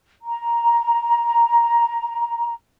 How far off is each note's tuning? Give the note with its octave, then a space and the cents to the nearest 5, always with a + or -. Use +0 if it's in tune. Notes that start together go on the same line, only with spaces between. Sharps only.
A#5 +5